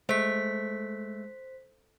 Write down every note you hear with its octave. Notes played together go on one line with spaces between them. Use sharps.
G#3 A3 C5 B6